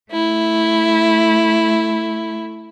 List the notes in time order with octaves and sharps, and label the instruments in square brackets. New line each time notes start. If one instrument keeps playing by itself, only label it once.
[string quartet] A3 E4